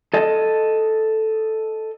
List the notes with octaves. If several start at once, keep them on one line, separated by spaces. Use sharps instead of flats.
A4 D#5